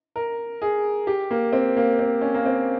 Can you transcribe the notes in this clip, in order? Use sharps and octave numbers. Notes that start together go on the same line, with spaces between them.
A#4
G#4
G4
A#3
C4
A#3
C4
C#4
A#3
C4